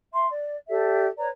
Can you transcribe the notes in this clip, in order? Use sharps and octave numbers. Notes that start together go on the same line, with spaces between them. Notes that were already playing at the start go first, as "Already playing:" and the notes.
E5 C6
D5
G4 A4 D5 E5
B4 C#5 D5 A#5